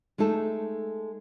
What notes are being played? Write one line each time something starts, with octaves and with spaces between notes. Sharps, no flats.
G#3 A3 D#4 A4